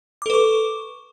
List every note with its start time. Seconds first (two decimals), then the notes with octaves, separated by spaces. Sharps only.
0.22 D6
0.26 A4
0.30 B4
0.34 C#6